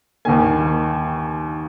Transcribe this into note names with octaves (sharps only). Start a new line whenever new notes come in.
D#2 D#3 A#3 G#5